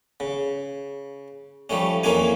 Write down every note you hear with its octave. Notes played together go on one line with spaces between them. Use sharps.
C#3
F3 G3 A3 C#4
F2 E3 A#3 C#4 F4 G#5